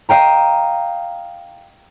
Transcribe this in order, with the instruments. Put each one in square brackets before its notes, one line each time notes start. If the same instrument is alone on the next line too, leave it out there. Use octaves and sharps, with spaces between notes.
[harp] D#5 F5 G5 A#5